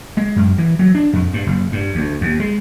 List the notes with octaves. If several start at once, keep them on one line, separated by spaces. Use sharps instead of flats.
G#3
F#2
E3
F#3
D4
F2
G2
F#1
G2
D2
D#2
G#3